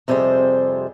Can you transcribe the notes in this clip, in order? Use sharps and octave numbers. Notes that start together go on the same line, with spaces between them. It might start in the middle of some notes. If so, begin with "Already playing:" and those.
F2 C3 G3 G#4 C5